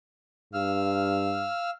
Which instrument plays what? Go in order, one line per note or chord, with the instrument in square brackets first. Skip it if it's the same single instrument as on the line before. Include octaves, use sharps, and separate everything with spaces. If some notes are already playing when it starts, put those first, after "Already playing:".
[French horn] G2 [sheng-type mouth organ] F5 E6 F6